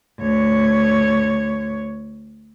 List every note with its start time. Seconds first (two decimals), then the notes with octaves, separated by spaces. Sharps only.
0.19 D2 C#5